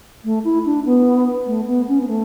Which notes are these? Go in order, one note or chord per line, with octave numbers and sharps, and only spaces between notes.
A3
E4
D4
B3
A3
B3
C#4
B3
A3